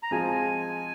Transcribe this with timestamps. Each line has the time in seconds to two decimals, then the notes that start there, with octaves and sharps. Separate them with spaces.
0.03 A#5
0.11 F3 G#3 C4 F4 G#4 G#5